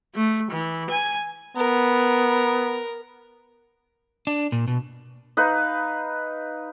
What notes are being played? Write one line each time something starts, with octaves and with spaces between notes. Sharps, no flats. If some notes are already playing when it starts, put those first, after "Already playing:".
A3
E3
G#5
B3 A#4
D4
A#2
B2
D#4 B4 F5